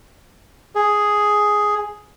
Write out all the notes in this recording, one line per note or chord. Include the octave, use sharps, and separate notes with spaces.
G#4